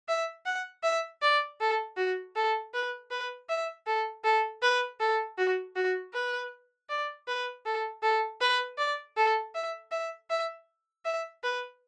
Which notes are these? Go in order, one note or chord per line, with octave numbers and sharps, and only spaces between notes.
E5
F#5
E5
D5
A4
F#4
A4
B4
B4
E5
A4
A4
B4
A4
F#4
F#4
B4
D5
B4
A4
A4
B4
D5
A4
E5
E5
E5
E5
B4